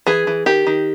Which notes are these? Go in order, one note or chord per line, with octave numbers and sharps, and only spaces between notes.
E3 G#4
E3
D#3 G4
D#3